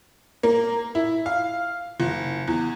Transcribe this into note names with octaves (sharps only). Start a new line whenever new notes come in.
A#3
E4
F5
F#1
E2